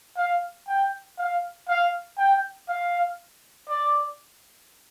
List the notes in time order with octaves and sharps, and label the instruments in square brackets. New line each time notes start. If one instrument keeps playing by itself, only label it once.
[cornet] F5
G5
F5
F5
G5
F5
D5